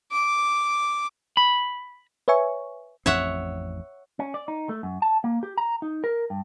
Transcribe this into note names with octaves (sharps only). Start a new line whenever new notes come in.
D6
B5
B4 C#5 E5 G#5 C#6
A1 F2 C4 C#5 E5 F#5
C#4
D5
D#4
A3
F#2
A5
A#3
G4
A#5
D#4
A#4
G2